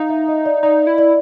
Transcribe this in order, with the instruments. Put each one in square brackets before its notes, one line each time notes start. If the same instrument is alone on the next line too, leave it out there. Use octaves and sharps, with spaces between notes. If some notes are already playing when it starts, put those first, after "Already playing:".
Already playing: [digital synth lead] D#4 [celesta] F5
[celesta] E5
D#5
D5
[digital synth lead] D#4 [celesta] D5
[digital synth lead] E4
[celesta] D5